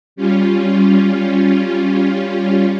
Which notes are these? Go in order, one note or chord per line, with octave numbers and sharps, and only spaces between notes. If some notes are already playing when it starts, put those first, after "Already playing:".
G3 C#4 F4